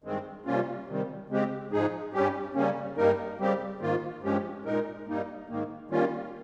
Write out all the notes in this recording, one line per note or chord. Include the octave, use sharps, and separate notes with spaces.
G2 D#3 G#3 C4
C3 G3 A#3 C#4 F4
C3 D#3 G3
C#3 G#3 C4 G4
G#2 F3 G#3 D#4 G#4
G2 G3 C#4 G4
C#3 G3 A#3 C#4
G2 G3 A#3 D#4 A#4
C#3 G3 C4 G4
G#2 D#3 A#3 F4
G2 F3 G#3 C#4 G4
A#2 G#3 D#4 A#4
G2 G3 A#3 D#4
G#2 D#3 A#3
D#3 G3 A#3 C#4 F4